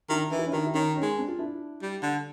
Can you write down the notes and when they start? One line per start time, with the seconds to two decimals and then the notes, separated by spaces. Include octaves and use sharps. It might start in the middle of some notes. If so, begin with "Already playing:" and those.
0.09 D#3 D4 E4
0.31 E3 D#4
0.39 E4
0.46 C#4 D#4
0.53 D#3 D4 E4
0.67 E4
0.74 D#3 C#4 D#4
0.96 C#4 D#4
1.03 G#3
1.17 C4 D4
1.28 F4
1.39 D4 E4
1.82 G3
2.02 D3